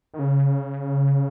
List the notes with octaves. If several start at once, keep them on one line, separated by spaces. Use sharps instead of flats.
D#3
C#3